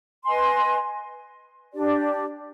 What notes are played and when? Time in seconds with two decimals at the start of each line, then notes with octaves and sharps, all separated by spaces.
0.25 B4 D#5 G#5 C6
1.72 D4 G4 D5